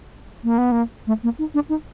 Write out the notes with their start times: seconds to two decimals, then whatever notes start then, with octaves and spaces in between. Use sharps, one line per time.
0.44 A#3
0.58 B3
0.72 A#3
1.07 A3
1.23 A#3
1.39 D#4
1.54 D4
1.69 D#4